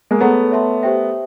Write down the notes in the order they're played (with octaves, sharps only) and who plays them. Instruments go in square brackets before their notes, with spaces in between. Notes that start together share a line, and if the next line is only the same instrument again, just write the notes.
[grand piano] G#3 A#3
[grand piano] A3 B3 [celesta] G#4 C#5 F#5 A#5
[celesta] C#5 E5 A5 C6
G4 C5 E5 G5